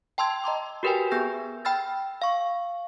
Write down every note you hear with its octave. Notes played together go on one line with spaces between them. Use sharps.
G5 A5 C6 E6 G#6
D#5 A#5 C6 D6
F#4 G4 A#4 B4 G5 G#5
B3 G#4 E6 G6 A#6
G5 B5 E6 F6 A6
F5 C#6